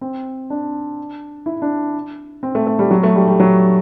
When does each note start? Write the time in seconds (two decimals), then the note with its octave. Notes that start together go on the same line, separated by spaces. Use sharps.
0.01 C4
0.50 D4
1.46 E4
1.62 D4
2.43 C4
2.55 A3
2.67 A3
2.79 G3
2.91 F#3
3.03 A3
3.15 G3
3.28 G3
3.40 F#3